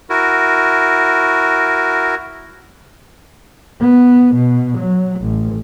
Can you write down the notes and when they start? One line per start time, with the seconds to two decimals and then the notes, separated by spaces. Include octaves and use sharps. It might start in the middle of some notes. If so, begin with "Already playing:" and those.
0.10 E4 F#4 A#4
3.80 B3
4.36 B2
4.78 F#3
5.21 A1